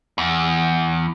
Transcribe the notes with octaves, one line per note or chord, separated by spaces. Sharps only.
E2